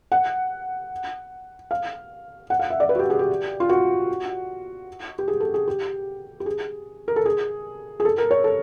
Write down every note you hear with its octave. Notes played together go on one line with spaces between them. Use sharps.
F#5
F5
F#5
F5
E5
D5
B4
F#4
G4
G#4
G4
F4
F#4
G4
G#4
A4
G#4
G4
G4
G#4
A#4
A4
G#4
G#4
A4
A#4
C#5
A4